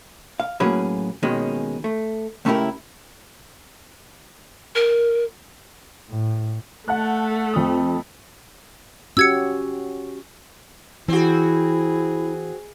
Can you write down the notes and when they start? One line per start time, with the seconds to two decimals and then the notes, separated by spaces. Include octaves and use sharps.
0.40 F5
0.60 A2 F#3 A#3 C#4 G#4 B4
1.23 D#2 B2 D#3 G#3 C#4
1.84 A3
2.45 C#2 A3 C#4 E4 G4 A#4
4.75 A#4
6.09 A2
6.88 A3 F#5 A5 F#6
7.54 F2 C4 D#6
9.17 C#4 F#4 G4 E6 G#6 C#7
11.08 E3 C4 E4 F#4 G#4